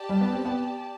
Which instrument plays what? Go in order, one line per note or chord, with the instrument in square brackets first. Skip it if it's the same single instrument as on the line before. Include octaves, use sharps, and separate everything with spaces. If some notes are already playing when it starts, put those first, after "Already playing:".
Already playing: [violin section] G4 D5 A5
[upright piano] G3
B3
C4
B3